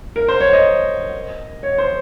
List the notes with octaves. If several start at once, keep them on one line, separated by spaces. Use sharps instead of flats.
A#4
C5
C#5
D#5
C#5
C5